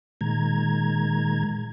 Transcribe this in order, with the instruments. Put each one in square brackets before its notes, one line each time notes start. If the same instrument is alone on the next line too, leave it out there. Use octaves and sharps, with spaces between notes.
[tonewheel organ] A#2 D#3 G#3 A#5 G#6